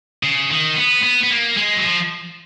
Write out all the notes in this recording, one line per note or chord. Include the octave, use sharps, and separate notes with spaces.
C#3
D#3
B3
B3
B3
A#3
G#3
F#3
F3